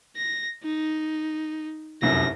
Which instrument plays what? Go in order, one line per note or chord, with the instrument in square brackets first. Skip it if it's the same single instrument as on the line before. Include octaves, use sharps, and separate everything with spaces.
[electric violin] A#6
D#4
[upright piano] F1 C2 F#2 [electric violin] A#6